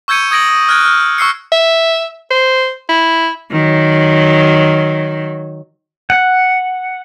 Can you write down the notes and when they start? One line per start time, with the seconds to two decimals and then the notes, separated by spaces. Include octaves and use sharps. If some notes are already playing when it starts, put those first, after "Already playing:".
0.08 C#6 E6 G6 G#6 C#7 D#7
0.31 D#6 G#6 A#6 D7 F#7
0.49 D#6
0.69 F6 F#6 G#6 D7
0.85 F6
1.18 C#6 E6 C7 C#7
1.52 E5
2.31 C5
2.89 E4
3.52 D#3 F#3
6.10 F#5